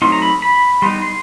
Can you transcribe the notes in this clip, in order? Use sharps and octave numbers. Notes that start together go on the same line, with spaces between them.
F#3 A3 C4 D#4 C6
A#5
B5
B5
G3 B3 D#4 C6
C6